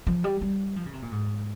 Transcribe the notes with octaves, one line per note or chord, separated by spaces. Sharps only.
F3
G3
G3
F3
C#3
C3
A#2
G#2